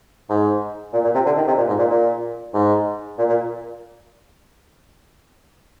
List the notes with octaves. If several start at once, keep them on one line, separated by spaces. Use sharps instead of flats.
G#2
A#2
A#2
C3
D3
D#3
C3
A#2
G#2
A#2
A#2
G#2
A#2
A#2